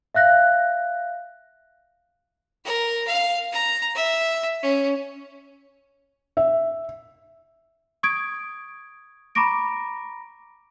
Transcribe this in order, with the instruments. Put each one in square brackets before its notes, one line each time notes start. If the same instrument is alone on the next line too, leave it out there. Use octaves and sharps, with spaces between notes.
[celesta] E5 F5 F#6 A#6
[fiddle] A#4
F5
A#5
E5
C#4
[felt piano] E5
[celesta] C#6 D#6 G#6 D7
A#5 B5 C#6 D6 A#6 D7